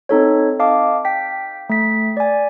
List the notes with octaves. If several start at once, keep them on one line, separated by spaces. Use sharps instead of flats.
C4 D#4 A4 C#5
D#5 F5 A5 D6
G5 B6
A3 B6
D5 G#5